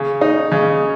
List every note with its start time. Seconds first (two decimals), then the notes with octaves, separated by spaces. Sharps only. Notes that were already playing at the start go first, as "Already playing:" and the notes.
Already playing: C#3
0.21 D#4
0.52 C#3